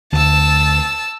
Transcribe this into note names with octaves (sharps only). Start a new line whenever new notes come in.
D2 A5 E6